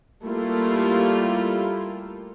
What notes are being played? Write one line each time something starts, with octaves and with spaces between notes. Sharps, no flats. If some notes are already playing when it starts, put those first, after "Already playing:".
G3 A3 A#3 E4 F4